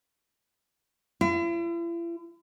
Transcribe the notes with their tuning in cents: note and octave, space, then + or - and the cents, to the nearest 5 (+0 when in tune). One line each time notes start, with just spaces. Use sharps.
E4 +45